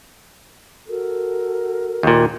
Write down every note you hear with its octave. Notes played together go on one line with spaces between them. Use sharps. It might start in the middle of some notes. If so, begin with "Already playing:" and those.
F#4 A4 A#4
D#2 A#2